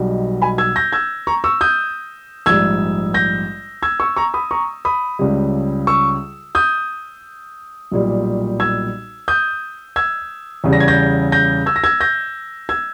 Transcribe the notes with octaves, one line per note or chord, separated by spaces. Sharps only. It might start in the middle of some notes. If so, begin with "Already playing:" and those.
Already playing: B1 B2 G3
G#5 B5
E6 G#6
G6 A#6
E6 G#6
A#5 C#6
C#6 E6
D#6 G6
A#1 G#2 G3 E6 G#6
G6 A#6
E6 G#6
C#6 E6
A#5 C#6
B5 D#6
A#5 C#6
B5 D#6
C#2 C#3 G3
C#6 E6
D#6 G6
B1 A#2 G3
E6 G#6
D#6 G6
E6 G#6
E2 C#3 G3
A#6
G#6
G6 A#6
G6 A#6
E6 G#6
A#6
E6 G#6
G6 A#6
E6 G#6